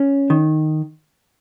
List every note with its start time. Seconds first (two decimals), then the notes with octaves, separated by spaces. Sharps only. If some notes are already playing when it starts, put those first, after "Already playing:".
Already playing: C#4
0.30 D#3